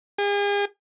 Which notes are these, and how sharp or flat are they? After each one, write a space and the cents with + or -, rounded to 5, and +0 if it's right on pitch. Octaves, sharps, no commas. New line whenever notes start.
G#4 -40